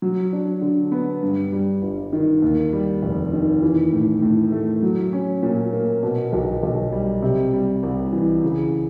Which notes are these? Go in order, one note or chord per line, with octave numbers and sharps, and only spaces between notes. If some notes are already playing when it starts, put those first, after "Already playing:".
F#3
D4
D3
B3
G2
G3
G1
D#3
D#2
G3
F1
D#3
E3
A2
A2
A3
F#3
C#4
A#2
A#3
B2
B1
B1
G3
C3
G3
C2
E3
C#3